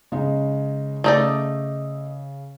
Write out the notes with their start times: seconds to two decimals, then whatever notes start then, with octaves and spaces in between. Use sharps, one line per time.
0.12 C#3 G#3 D#4
1.04 C#3 A3 D#4 D5